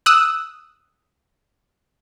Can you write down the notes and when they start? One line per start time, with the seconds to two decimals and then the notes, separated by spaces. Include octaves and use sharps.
0.06 D#6 E6 F#6